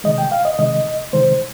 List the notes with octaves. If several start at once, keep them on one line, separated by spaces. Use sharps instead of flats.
C3 D#3 G#3 D#5
G5
F5
D#5
C3 D#3 G#3 D#5
C3 D#3 G#3 C5